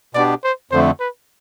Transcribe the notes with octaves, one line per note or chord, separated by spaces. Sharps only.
B2 B3 D4 G4 D5
C5
F2 D3 A3 C5
B4